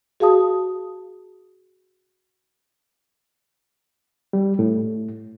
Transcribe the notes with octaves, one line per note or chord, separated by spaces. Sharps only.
F#4 G#4 F5 A5 D#6
G3
A2